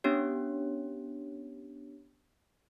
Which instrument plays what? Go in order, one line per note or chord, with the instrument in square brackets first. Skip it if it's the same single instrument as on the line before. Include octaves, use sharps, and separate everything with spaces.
[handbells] B3 C#4 D4 G4 C#5